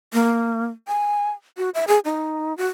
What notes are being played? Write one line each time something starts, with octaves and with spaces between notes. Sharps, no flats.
A#3
G#5
F#4
E5
G#4
D#4
F#4